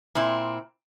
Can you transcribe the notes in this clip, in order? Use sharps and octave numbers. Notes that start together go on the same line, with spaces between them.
A#2 C4 E4